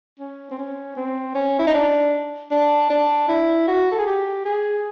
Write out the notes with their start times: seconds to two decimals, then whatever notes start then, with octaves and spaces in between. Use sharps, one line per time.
0.20 C#4
0.51 C4
0.58 C#4
0.97 C4
1.35 C#4
1.59 E4
1.67 D#4
1.74 D4
2.51 D4
2.90 D4
3.28 E4
3.67 F#4
3.92 A4
3.98 G#4
4.06 G4
4.45 G#4